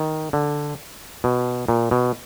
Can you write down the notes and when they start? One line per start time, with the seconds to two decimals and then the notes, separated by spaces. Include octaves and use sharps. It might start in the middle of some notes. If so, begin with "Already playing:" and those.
Already playing: D#3
0.33 D3
1.24 B2
1.68 A#2
1.91 B2